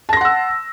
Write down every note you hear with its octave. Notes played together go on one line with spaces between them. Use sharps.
F#5 A5 C6 E6 A#6